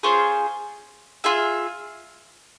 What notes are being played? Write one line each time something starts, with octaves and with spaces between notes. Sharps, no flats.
C#4 F4 G#4 C5
F4 G#4 E5